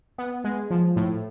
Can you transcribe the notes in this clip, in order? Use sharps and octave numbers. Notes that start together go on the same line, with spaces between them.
B3
G#3
F3
A2